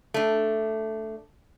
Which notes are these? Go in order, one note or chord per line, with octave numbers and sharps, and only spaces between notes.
A3 D4